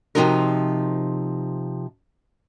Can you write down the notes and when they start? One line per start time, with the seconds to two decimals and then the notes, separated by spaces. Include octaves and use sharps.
0.15 C3 E3 F3 D#4 F#4 A#4